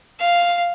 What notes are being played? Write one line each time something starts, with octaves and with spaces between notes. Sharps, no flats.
F5